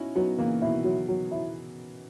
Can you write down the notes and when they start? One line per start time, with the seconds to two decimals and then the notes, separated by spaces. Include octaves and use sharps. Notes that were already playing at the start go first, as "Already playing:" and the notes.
Already playing: C#4 D#4 E4 F#4
0.15 F#3 B3 D#4
0.38 C#3 E3 A#3
0.62 B2 D#3 E4
0.84 F#3
1.08 F#3
1.31 E4